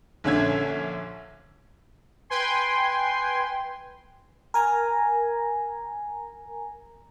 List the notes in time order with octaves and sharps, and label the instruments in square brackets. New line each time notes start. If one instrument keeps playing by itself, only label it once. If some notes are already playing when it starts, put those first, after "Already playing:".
[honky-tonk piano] A#1 D3 C#4 E5 G#6
[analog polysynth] B4 G5 G#5 C6
[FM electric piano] A#4 G#5 A#5